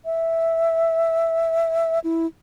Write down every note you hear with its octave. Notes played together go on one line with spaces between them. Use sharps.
E5
E4